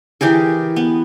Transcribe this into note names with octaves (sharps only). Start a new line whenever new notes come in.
E3 G4 G#4 A#4
B3